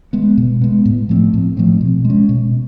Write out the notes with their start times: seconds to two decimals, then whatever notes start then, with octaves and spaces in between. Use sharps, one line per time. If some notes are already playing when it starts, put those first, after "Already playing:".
0.13 G#3 B3
0.38 B2
0.61 G#3 B3
0.85 A2
1.09 F3 A3 C4
1.34 A2
1.57 F3 A3 C4
1.81 B2
2.05 G#3
2.10 C#4
2.29 B2